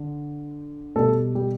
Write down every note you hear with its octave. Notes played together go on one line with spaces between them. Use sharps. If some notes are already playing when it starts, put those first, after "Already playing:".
Already playing: D3
B2 G3 A3 A4
G3 G4